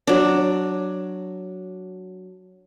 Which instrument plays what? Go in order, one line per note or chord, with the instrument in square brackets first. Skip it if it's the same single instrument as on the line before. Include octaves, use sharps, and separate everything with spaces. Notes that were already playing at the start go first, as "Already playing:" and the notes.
[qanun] F#3 D4